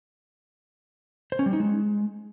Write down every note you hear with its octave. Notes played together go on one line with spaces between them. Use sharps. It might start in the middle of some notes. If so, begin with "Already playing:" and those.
C5
C#4
G3
D#4
G#3